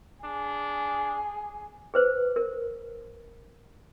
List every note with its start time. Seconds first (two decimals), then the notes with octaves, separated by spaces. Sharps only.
0.24 D4 G#4
1.94 G#4 B4 C5
2.36 A#4